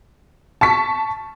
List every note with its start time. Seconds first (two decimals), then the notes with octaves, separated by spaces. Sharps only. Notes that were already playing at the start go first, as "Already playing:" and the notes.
0.61 A5 C#6 B6